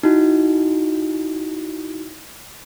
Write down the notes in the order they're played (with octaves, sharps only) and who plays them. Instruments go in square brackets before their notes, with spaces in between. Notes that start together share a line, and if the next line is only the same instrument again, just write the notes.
[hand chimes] D#4 E4 F#4